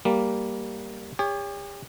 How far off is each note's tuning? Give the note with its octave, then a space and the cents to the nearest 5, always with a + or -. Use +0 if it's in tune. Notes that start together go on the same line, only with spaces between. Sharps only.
G3 +0 A#3 +0
G4 +45 C#5 +25